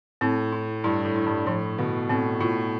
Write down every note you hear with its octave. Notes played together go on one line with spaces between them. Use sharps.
A2 C4
E4
G2 E4
A2
E4
G2
A2 F3
B2 D3
A2 C4
A2 F4